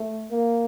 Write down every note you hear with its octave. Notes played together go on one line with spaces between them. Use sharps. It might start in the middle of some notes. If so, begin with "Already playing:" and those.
Already playing: A3
A#3